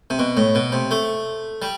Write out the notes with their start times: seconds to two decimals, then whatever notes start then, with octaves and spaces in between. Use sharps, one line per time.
0.10 C3
0.19 B2
0.37 A2
0.55 B2
0.72 C3
0.91 A3
1.62 G3